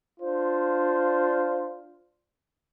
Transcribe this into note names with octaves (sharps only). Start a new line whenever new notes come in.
D4 F4 C5